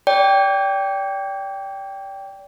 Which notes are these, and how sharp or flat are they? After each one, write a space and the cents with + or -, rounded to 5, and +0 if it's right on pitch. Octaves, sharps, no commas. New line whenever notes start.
D5 -35 G5 +0